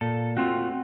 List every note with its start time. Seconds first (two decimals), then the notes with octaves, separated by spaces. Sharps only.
0.01 A#2 A4
0.37 A3 C4 F4 F#4